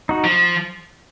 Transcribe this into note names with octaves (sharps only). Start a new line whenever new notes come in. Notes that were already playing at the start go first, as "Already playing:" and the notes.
D#4 F#4
F3